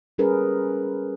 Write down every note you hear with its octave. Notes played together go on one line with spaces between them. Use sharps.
G3 C#4 G#4 A#4 B4